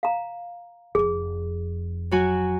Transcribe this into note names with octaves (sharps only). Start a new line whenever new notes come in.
F5 A#5
F1 F2 G#4
F#3 F#4 G#5